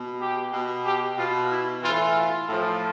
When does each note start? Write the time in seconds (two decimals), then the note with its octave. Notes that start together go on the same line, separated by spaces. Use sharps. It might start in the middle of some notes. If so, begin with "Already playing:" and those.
Already playing: B2
0.20 G4
0.53 B2
0.85 G4
1.18 B2 F4
1.51 E4
1.83 A2 E3 F4
2.16 F4
2.49 A2 F3